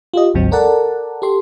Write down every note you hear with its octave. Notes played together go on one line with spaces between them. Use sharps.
F4 G4 D#5
G#1 D2 G#2 F#3 C4
A4 A#4 D5 F#5 A5
G4 A4 C6